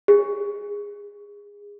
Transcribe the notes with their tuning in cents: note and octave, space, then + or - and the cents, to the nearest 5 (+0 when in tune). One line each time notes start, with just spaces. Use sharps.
G#4 -20